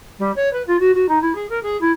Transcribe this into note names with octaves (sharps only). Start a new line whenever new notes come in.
G3
C#5
B4
F4
F#4
F#4
D#4
E4
G#4
A#4
G#4
E4